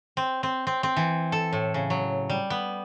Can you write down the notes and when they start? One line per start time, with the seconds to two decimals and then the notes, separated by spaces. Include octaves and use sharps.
0.17 C4
0.43 C4
0.67 C4
0.83 C4
0.97 E3
1.32 A4
1.53 A2
1.74 C#3
1.90 F#3
2.30 G3
2.50 B3